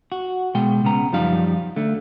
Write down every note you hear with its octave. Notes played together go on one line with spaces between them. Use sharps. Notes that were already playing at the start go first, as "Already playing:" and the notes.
F#4
B2 G#3 G5
C#2 C#3 B3 A#5
F#2 F3 G3 D#4 F5
D3 A3